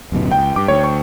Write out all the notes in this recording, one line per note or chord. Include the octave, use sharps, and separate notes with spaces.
D1 F#2 B2
C#2 G5
G2 D6
D2 C#5
C#6